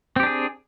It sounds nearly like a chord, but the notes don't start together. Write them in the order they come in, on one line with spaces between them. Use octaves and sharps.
C4 G4 D4 G#4